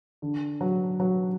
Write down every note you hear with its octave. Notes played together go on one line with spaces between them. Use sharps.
D3
F#3
F#3